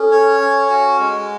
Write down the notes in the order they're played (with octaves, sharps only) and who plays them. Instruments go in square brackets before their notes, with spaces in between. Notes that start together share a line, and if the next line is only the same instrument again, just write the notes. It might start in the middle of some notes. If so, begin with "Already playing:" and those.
Already playing: [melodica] C#4 [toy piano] A4
[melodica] C#5
C#4
F#4
G#3